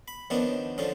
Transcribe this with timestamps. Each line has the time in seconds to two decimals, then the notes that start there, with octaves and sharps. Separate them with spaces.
0.08 B5
0.30 D#3 F3 B3 C#4 D4
0.78 D3 F3 C#4